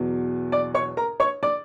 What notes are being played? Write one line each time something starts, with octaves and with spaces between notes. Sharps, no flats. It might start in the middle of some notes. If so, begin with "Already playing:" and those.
Already playing: E2 B2 F#3
D5 D6
C#5 C#6
A#4 A#5
C#5 C#6
D5 D6